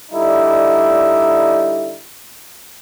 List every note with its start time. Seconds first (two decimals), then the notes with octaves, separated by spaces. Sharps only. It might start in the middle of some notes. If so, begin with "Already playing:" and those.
0.12 D3 G3 D#4 E4